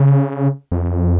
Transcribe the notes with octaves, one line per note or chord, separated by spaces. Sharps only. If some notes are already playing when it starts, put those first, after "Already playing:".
Already playing: C#3
F2